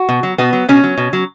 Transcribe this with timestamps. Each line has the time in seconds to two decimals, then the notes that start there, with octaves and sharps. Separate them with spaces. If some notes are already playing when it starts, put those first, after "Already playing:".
Already playing: F#4
0.09 B2
0.23 F#3
0.38 B2 B3
0.53 F#3
0.69 B2 C#4
0.84 F#3
0.98 B2
1.13 F#3